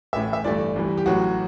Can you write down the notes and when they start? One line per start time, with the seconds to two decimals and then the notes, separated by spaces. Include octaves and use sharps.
0.13 A1 A2 E3 E5
0.33 E5
0.44 G1 G2 E3 A3 D5
0.76 C2 C3 E3 G3
0.97 G4
1.06 A1 A2 F#3 F#4